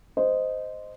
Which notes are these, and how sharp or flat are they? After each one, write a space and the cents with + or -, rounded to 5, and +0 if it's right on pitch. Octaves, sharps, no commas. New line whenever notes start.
C5 -10 D#5 -5